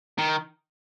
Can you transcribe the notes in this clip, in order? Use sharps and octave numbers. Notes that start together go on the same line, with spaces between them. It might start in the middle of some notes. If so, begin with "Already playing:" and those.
D#3